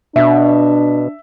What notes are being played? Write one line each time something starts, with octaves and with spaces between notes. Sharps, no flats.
B2 D4 E5